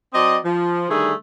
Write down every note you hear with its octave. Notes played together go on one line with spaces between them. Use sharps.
F#3 C4 D5 D#5
F3
D3 D#3 G3 A3 G#4